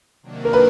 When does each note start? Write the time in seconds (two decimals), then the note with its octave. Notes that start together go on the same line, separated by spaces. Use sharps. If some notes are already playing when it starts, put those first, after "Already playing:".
0.22 C3 D#3 F#3 A#3 D4
0.45 A#4
0.53 B4